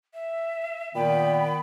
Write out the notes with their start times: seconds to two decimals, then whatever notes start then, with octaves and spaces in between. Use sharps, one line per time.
0.14 E5
0.95 A#2 D#3 B3 G5 B5